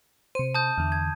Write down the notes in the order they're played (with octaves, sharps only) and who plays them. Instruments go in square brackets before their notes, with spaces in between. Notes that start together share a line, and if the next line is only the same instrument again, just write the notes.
[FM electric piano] C3 C5 [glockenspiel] D#7
[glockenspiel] A5 D#6 G6
[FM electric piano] E2 D3
[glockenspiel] G#6